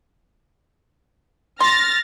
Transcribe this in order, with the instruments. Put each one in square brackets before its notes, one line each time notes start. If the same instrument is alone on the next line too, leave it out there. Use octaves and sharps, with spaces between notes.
[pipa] C6 [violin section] F6 A6 A#6